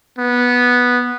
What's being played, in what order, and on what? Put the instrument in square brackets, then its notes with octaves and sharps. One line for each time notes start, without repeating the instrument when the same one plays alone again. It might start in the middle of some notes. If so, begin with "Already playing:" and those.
[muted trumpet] B3